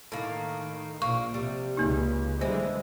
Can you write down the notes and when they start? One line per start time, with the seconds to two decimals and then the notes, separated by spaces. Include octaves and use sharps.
0.12 A2 D#3 A#3
1.02 A#1 A#2 A#3 C#6
1.34 C3 G3
1.77 C#2 A#3 D#4
2.41 D3 E3 G3 G#3 C5